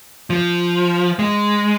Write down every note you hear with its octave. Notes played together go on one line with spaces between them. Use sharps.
F3
G#3